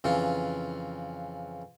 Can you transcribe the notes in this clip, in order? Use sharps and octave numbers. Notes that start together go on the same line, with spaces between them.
F2 C#3 E3 F4